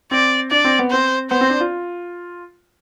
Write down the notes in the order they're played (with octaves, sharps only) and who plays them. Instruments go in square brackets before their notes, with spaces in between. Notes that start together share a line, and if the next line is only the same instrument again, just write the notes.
[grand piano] C4 [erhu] D5
[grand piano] D4 [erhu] D5
[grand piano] C4
B3
[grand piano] C4 [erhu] C5
[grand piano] B3 [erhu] C5
[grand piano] C4
D4
F4